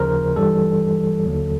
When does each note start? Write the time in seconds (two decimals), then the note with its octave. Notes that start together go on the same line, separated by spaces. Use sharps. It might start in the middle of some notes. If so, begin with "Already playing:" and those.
Already playing: D#2 C#3 F3 A#4 C5
0.36 G2 E3 G3 A4
1.25 D#2 D3 F#3